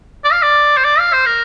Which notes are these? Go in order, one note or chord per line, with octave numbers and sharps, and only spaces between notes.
D5
F5
D5
C5
D5
F5
C5
A#4